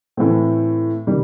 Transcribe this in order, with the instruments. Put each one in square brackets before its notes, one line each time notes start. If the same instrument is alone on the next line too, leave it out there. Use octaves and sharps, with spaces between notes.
[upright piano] A2 E3 A3 C4
C3 D#3 G3